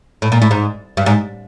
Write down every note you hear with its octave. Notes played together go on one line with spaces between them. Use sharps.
A2
A#2
A2
G#2
G2
G#2